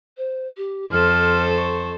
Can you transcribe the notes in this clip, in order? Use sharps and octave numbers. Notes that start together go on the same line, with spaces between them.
C5
G4
F2 A4 C5 F6
C#6